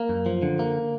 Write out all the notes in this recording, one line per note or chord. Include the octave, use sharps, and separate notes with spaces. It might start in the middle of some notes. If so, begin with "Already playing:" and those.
Already playing: A#3
F#2
F3
D3
A#3